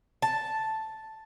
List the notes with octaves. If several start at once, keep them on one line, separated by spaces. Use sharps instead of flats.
A5